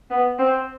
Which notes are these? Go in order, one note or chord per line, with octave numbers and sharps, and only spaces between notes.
B3
C4